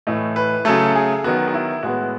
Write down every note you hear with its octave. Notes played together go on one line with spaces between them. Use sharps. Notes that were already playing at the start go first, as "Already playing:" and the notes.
A2 E3 A3 D#5
B4
C#3 F#3 A3 A4
G#4
D#3 F#3 B3 F#4
F#4
E4
A2 G#3 B3 F#4